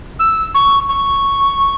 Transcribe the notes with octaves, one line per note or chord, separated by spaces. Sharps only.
E6
C#6
C#6